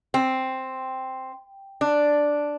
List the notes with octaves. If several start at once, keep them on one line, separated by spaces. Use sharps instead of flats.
C4
D4